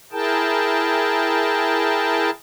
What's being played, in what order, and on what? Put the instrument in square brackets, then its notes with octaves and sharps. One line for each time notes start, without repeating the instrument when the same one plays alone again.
[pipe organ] E4 G#4 A#4 G5 A5